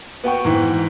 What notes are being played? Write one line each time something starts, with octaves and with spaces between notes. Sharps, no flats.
B3 F#4 G5 C#6
G#2 E3